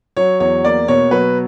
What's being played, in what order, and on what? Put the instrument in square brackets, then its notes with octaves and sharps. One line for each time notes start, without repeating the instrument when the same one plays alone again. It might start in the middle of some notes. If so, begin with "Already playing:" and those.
[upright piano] F#3 C#5
E2 C#5
A#3 D5
B2 C#5
F#3 B4